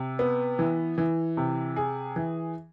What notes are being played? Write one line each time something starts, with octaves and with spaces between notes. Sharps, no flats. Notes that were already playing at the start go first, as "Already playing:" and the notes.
Already playing: C3
B3
E3
E3
C3
G#4
E3